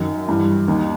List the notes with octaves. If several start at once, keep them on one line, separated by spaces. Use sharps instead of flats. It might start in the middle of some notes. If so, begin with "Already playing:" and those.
Already playing: F#2 D#3
G2 E3
D#2 D#3